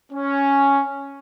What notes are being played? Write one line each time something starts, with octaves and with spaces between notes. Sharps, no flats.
C#4